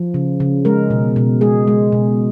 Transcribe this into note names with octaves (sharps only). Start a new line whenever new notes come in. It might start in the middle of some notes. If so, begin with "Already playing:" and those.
Already playing: F3
C#3
C#3
G#3 A#4
B2
B2
G#3 G#4
G#3
B2